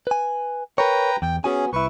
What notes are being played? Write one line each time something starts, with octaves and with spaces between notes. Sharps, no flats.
B4 G#5
A#4 B4 C#5 G5 A#5
E2 G5
B3 C#4 F#4 G#4 G#5
C2 E4 B4 C#6